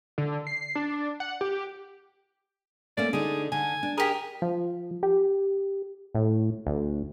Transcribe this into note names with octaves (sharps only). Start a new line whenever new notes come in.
D3
C7
D4
F#5
G4
A3 A#3 C#4 D5
D3 D#4 G#4
D3 G#5
D4
G4 G#4 A#4
F3
G4
A2
D2